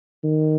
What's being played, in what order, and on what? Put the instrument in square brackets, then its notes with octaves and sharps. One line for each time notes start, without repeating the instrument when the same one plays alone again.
[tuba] D#3